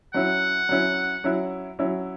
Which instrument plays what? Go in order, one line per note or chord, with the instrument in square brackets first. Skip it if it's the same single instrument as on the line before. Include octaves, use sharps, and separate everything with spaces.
[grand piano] F#3 C#4 E4 [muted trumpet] F#5
[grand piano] F#3 C#4 E4
F#3 C#4 E4
F#3 C#4 E4